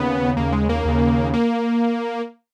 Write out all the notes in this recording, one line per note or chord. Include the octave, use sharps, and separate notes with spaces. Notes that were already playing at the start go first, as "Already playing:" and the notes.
Already playing: D#2 C#3 B3
D#2 C#3 A#3
G#3
A#3
D#2 C#3
A#3